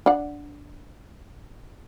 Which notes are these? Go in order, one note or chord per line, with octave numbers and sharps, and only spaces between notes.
D4 F#5